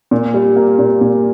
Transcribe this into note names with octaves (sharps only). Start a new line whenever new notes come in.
A#2
G3
A#3
A#2
A#2